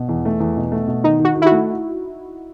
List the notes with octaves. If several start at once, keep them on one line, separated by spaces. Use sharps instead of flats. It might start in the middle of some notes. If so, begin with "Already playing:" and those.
Already playing: B2
E2
A3
E2
B2
A3
B2
D#3 D#4
D#3
F#4
D#3
E4
F#4
A3